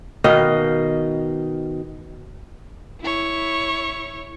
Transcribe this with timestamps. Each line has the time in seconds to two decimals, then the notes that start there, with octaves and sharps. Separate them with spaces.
0.24 B2 D#3 D#5 F5
3.01 E4 C#5